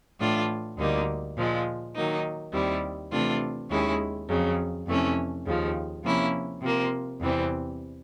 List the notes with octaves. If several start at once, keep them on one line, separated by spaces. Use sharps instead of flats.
A2 E3 A3 D4 F4
D2 D3 G3 A#3 D#4
A#2 F3 G#3
D#3 F#3 A#3 D#4
D#2 D#3 G3 C4 E4
C3 E3 A3 D4 F4
D#2 D#3 G#3 C#4 E4
F2 C#3 F#3
F2 C3 E3 A3 C#4
D#2 C#3 F3
C3 F3 A#3 C#4 E4
C3 F3 A#3
E2 C3 E3 G3 C4